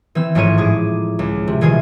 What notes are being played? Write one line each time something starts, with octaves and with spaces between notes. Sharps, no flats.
E3 C4 E6
A1 G#2 F3 F4 C#5 D#7
A2 G#4 D6
C#2
C3
D#1 E3 G#3 F4 G#5 C7